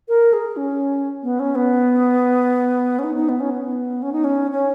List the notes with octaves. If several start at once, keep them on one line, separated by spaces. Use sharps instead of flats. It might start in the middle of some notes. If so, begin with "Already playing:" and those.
A#4
G#4
C#4
B3
C#4
B3
C#4
D#4
D#4
B3
C#4
B3
C#4
D#4
C#4
C#4